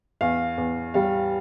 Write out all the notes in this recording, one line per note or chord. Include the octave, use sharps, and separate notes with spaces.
E2 F5
E2
G3 F5